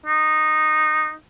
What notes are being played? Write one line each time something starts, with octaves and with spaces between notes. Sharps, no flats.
D#4